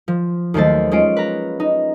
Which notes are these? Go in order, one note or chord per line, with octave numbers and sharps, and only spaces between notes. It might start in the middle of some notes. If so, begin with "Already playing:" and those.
F3
D#2 D#3 F#3 A3 C5 A6
G#3 C#4 F4 D7
B4 A#5
D#4